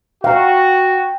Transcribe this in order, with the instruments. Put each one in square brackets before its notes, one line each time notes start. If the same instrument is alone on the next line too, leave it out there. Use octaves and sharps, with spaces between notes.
[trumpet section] F#4 [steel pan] F5 A#5 [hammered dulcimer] G5